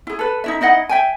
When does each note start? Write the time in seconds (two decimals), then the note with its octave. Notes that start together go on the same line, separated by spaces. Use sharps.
0.07 E4 G#4
0.19 A4 B4
0.44 D#4 E4 E5
0.61 D#4 E4 D#5 F#5
0.89 E5 G5 G#5